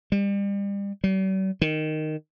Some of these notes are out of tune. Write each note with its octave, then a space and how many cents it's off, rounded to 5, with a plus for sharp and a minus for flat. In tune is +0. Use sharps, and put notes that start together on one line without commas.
G3 +35
G3 -45
D#3 -5